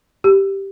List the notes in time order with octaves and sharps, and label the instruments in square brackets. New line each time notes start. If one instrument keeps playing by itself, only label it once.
[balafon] G4